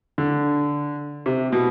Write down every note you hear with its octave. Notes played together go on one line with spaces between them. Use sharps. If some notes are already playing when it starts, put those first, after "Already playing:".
D3
C3
B2